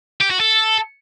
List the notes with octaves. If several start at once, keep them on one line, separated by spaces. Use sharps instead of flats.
G4
F#4
A4